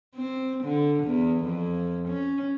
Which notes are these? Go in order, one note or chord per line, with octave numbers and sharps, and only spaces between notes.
C4
D3
E2
F2
C#4